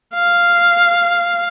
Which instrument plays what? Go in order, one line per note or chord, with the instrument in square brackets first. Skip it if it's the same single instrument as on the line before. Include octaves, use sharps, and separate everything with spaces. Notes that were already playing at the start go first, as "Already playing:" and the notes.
[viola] F5